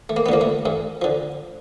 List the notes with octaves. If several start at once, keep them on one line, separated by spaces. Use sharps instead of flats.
A3
A#3
B3
D3 F3 A#3
A3
G2 A3
D3 F3